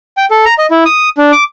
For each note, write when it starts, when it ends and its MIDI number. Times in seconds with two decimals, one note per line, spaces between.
0.17 0.26 79
0.30 0.45 69
0.45 0.54 82
0.58 0.66 75
0.71 0.84 64
0.86 1.09 87
1.18 1.32 62
1.32 1.44 86